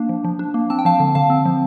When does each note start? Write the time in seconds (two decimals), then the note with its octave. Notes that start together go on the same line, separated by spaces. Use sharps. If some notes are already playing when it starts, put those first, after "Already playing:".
Already playing: A#3 D4
0.09 F3
0.24 F3
0.39 D4
0.54 A#3
0.70 C4 A5
0.79 G5
0.85 F3 F5 A5
1.00 D3
1.15 D3 F5 A5
1.30 C4
1.45 F3